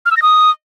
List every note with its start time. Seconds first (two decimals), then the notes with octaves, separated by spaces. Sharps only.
0.06 F6
0.11 E6
0.17 A#6
0.22 D#6